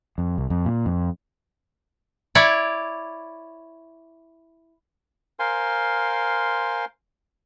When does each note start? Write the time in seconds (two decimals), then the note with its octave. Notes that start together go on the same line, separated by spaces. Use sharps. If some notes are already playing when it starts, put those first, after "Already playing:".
0.18 F2
0.38 C2
0.50 F2
0.66 A#2
0.86 F2
2.35 E4 C#5 D5
5.39 A#4 C5 F5 G#5 C6